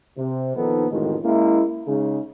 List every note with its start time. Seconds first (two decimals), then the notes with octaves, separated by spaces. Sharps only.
0.17 C3
0.56 A#1 D#3 F3 B3 D#4 A4
0.91 A1 F2 A2 D#3 G#3 F#4
1.24 G#3 A#3 C#4 E4
1.87 C#3 G#3 D#4